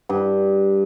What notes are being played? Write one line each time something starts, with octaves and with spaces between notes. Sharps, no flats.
G2